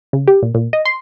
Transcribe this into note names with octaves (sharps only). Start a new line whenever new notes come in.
C#3
G4
A#2
A#2
D#5
C6